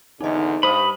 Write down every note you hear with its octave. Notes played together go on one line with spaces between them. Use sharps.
G#1 E2 D3 D#4 D#5
G2 C5 B5 D#6